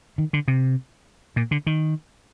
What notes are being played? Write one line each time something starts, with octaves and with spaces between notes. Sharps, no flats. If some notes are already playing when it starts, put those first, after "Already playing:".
D#3
D3
C3
A#2
D3
D#3